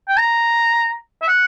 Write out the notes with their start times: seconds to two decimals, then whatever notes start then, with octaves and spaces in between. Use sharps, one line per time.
0.08 G5
0.17 A#5
1.22 E5
1.28 F#5